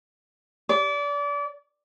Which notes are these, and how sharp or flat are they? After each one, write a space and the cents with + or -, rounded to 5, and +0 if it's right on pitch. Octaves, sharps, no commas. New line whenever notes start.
D5 -30